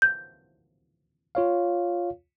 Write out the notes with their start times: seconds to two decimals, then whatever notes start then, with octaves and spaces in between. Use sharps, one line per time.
0.02 G6
1.35 F4 C#5 F5